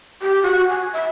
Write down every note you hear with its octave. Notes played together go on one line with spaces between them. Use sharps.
G4
F#4
G#5
E5